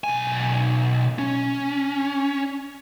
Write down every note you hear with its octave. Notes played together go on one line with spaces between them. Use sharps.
B1 G#5
C#4